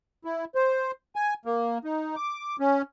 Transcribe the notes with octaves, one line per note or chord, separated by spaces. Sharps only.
E4
C5
G#5
A#3
D#4
D6
C#4